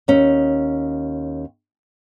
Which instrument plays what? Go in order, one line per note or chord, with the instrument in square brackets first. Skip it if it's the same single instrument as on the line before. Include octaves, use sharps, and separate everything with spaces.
[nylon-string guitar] D#2 C#4